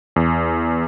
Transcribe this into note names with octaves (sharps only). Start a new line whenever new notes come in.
E2